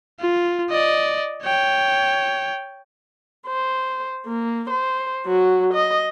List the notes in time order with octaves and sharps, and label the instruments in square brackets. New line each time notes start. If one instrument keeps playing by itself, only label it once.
[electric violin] F4
D5 D#5
C#5 G5
[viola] C5
A#3
C5
F#3 F#4
D#5